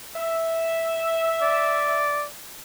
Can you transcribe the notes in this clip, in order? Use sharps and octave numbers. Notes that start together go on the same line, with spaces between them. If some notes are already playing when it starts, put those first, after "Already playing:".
E5
D5